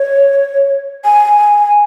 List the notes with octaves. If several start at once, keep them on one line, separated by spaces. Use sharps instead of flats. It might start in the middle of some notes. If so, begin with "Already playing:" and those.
Already playing: C#5
G#5